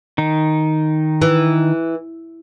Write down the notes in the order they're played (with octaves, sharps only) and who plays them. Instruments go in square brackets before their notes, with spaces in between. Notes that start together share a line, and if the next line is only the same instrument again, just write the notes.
[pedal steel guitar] D#3 D#4
[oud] E3